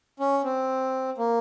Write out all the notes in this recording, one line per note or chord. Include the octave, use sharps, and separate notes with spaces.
C#4
C4
A#3